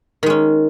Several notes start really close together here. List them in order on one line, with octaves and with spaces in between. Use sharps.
D#3 G#3 C#4